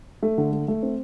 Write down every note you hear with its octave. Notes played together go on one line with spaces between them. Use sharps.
A3
D3
A3
A3
C4